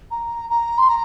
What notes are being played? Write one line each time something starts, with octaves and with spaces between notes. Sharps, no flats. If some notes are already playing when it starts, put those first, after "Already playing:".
A#5
A#5
C6
A#5